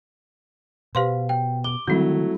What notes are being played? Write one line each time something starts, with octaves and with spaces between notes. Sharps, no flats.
B2 G4 B4 C5 F5 C6
G5
D6 G7
D3 D#3 F#3 G3 A3 C4 D4 E4